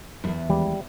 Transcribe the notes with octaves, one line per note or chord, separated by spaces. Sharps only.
E2 G#2
D#2 E3 G3 G#3